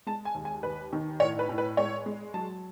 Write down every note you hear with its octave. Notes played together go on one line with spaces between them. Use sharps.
G#3 A5
G#5
D#2
G#5
D#2 B4
D#3
A2 C#5
B4
A2
B4
G#3 C#5
G#3
F#3 A5